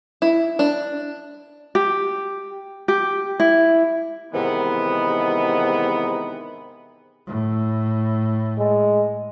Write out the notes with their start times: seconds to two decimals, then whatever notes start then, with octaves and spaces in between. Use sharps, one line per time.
0.22 E4
0.59 D4
1.75 G4
2.88 G4
3.40 E4
4.34 G#2 C3 D#3 E3 B3
7.27 A2
8.58 G#3